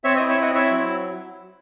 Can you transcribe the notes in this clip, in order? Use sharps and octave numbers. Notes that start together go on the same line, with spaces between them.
C4 C#5 E5
C5 D#5
E4
C#5 E5
C4 D#5 F#5
E4 C#5 E5
F#3